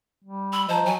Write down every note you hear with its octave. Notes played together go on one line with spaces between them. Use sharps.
G3
B5 E6
F3 C5 D#5 A5 A#5
F#3 G#5